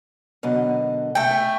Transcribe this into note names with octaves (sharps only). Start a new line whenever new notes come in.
F#2 B2 D3
A3 G5
E5